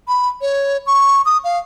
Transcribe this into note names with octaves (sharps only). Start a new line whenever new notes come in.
B5
C#5
C#6
D#6
F5